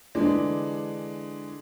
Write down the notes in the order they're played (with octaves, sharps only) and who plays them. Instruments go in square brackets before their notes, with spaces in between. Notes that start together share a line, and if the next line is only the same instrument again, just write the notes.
[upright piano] D3 E3 G#3 D4